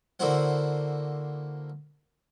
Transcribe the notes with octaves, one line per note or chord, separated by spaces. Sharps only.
D3 A#3 E4 F#4 C5 F#5